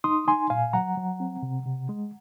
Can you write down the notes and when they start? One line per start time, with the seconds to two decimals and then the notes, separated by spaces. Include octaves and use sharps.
0.04 D#4 C6 D#6
0.27 D#4 G#5 C6
0.50 A#2 F5 G#5
0.73 F#3 F#5 A#5
0.97 F#3
1.20 C4
1.43 C3
1.66 C3
1.89 G#3